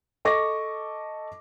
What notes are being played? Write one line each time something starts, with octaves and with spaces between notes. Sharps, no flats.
A4 D#5 C#6 D6 A#6